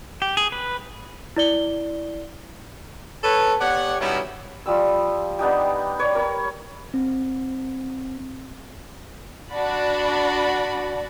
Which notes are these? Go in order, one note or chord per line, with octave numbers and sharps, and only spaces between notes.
G4
G#4
B4
E4 D5 G7
A4 B4 C#5
B3 G4 C#5 D5 F#5
B2 G3 B3 C#4 D#4 E4
F3 G3 E6
B3 D4 D#4 G4
B4 C#5 D5
A#4 C#5 A#5 B5
C4
D4 F#4 D5 B5